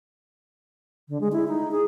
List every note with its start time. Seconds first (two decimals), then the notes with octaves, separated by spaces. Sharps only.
1.09 D3
1.21 G#3
1.32 E4
1.48 D#4
1.71 G#4